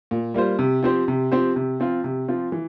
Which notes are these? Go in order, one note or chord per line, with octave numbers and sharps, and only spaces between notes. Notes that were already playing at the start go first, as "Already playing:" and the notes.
A#2
G3 A#3 F4 C5
C3
F3 C4 G4 C5
C3
F3 C4 G4 C5
C3
F3 C4 F4
C3
F3 C4 F4
E3